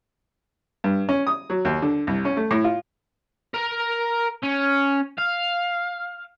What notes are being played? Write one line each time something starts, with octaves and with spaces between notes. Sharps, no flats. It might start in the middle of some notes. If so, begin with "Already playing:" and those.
G2
C#4
D#6
F#3
D#2
D3
C2
C#4
A3
A2
F4
A#4 A#5
C#4
F5